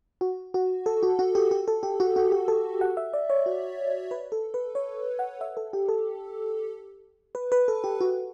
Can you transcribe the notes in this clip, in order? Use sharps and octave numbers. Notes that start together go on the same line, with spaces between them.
F#4
F#4
A4
F#4
F#4
G4
G4
A4
G4
F#4
F#4
G4
A4
F#5
E5
D5
C#5
F#4
B4
A4
B4
C#5
F#5
E5
A4
G4
A4
B4
B4
A4
G4
F#4